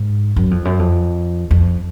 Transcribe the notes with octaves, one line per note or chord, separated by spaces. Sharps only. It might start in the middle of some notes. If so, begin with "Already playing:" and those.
Already playing: G#2
F#2
F2
F#2
F2
F2